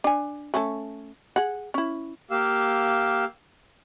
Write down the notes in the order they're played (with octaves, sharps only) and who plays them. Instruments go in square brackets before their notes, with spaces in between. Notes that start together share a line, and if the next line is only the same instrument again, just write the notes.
[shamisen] D4 G#5
A3 C#4 A4
G#4 F#5
C#4 E4
[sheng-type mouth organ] A#3 G4 F5 E6